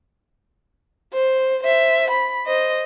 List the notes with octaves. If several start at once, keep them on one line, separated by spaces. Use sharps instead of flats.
C5
C5 E5
B5
C5 D#5